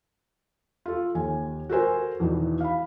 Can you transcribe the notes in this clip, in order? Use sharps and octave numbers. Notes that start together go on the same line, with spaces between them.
F4 A4
D#2 G#5
F#4 A4 A#4 C5 G#5
E2 B2 D#3 E3
F5 B5